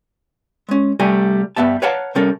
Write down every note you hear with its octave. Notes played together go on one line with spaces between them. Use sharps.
G#3 C#4
C2 G3 A3 G#5 A#5
G2 G3 B3 E5 A5
B4 C#5 F5 F#5 A5 A#5
C3 G3 C#4 A4 A#4